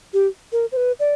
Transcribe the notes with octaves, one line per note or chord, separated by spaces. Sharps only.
G4
A#4
C5
B4
D5